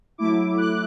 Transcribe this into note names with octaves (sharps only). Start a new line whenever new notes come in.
F#3 A3 E4 D6
F#6